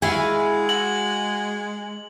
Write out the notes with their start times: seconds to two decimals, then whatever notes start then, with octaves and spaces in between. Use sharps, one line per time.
0.02 G#3 E4 F#4 G#4 F5 G#5
0.69 F#4 F#7